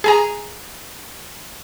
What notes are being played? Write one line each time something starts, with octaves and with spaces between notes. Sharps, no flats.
G#4 G#5 A#5